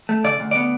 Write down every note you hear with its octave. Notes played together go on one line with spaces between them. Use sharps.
A3
C#3 D5
D2
B3 D5